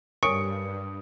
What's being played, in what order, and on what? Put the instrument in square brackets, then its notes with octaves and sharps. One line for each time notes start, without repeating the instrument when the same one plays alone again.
[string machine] G2 [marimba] A#4 C#5 G#5 [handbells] C#6 [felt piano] D#6 C#7 D7